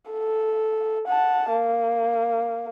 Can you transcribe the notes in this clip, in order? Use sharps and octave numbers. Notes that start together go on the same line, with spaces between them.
A4
F#5 A5
A#3